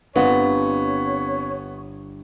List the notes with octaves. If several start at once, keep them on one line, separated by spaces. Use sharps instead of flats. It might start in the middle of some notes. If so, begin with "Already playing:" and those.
G1 B3 C4 D4 F4 C#5